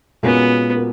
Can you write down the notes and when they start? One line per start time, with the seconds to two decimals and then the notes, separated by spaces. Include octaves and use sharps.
0.23 A#2 G#3 B3 C#4 F#4 A#4
0.76 F#4 A#4